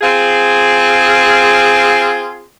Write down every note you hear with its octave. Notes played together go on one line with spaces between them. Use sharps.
C4 F4 G#4